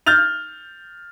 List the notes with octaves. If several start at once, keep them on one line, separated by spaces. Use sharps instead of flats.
F6 G6 A6 F7